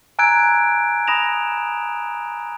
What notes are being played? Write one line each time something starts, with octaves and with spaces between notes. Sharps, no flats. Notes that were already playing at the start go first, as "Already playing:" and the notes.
G#5 A#5 E6 F#6 G#6 D7
B5 D#6 A#6 E7 F7